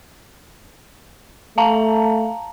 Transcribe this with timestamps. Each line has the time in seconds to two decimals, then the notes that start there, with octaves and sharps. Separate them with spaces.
1.58 A3 F5 A5 A#5